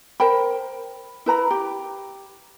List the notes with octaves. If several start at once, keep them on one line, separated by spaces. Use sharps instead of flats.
A#4 C5 G5 B5
E4 B4 A#5 B5
G4